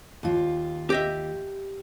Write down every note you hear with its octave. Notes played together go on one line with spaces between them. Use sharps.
D#2 F4
G4 D#5 E5